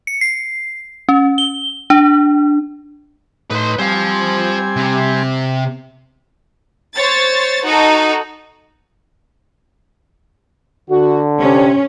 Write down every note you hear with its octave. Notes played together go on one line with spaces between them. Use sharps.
C#7
C7
C#4
G7
D4
A2 D#4 B4 C6
G3 C4 C5 F5 G#5
C3
C5 C#5 A6
D#4 F#4 A4
D3 F#4
C3 C#4